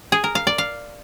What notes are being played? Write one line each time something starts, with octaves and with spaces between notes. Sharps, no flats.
G#4
A#4
F5
D5
F5